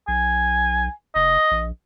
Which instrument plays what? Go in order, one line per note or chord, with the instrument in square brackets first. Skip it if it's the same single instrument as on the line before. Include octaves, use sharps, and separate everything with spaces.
[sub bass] B1 [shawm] G#5
[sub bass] F1 [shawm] D#5
[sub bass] A#1